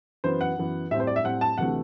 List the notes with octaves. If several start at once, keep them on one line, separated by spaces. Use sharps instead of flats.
F#2 E3 B3 C5
F#5
F#2 E3 B3
A2 G3 C4 E5
C5
D5
E5
A2 G3 C4 F#5
A5
D2 C3 E3 A3 F#5